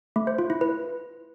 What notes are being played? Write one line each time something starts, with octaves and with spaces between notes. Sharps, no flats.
A3
C5
F4
E4
B4